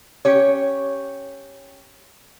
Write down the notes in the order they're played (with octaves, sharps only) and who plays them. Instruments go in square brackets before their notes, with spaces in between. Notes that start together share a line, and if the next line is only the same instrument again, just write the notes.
[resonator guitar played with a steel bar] C#4 G4 C#5